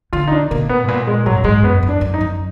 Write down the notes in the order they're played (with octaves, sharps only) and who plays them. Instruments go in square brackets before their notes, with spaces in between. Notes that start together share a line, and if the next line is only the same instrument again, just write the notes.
[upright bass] D3 [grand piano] F4
[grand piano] D#4
D4
[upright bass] B2 [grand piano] A#3
[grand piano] B3
[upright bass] G#2
[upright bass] A#2 [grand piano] B3
[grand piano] G#3
[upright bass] G#2 [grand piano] F#3
[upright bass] F#2
[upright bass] G#2 [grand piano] G#3
[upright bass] F#2 [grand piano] B3
[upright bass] F#2
[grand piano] D4
[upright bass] F#2
[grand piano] D#4
[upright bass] F#2